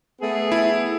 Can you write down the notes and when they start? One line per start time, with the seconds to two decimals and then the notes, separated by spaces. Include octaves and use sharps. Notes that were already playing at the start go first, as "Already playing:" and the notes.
0.21 A3 B3 G#4
0.52 E4